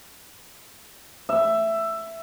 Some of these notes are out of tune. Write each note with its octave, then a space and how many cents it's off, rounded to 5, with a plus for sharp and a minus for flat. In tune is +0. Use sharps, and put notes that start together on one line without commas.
E5 +10